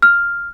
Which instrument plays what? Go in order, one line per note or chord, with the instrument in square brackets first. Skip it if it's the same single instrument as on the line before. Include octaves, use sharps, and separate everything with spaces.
[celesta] F6